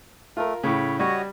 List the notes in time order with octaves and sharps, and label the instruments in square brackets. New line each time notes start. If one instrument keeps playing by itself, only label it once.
[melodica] A3 [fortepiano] F4 A#4
[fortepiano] A2 C#3 [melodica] C#5 B5
[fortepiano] G3 [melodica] F#4 C#5 D#5